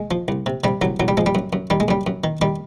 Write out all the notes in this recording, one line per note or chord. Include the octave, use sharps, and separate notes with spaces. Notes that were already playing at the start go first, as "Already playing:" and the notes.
Already playing: G#3
F3
C2
C3
C3 G3
C2 F#3
C2 F#3
G3
F3 G#3
G3
F#2
F#2
D#3 G3
G#3
F#2 G3
F#2
D#3
D#3 G3